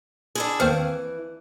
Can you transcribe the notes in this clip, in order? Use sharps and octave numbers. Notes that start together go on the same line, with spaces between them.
D4 E4 G#4
D#2 E3 C4 F5